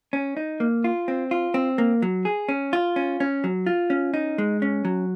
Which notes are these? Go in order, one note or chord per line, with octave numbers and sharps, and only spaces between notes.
C#4
D#4
A#3
F4
C4
F4
C4
A#3
F#3
G#4
C#4
F4
C#4
C#4
F#3
F4
C#4
D#4
G#3
C#4
F#3